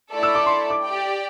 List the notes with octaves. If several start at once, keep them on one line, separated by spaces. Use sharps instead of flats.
A3 E4 A4 D5
E6
D6
C6
D6
G4 D5 G5